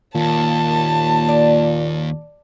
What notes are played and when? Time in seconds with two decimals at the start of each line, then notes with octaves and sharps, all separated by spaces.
0.15 D#2 A#2 A5
1.29 D5